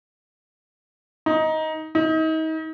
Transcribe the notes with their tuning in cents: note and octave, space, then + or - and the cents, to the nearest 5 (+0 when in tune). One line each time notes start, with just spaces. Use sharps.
D#4 +15
D#4 +35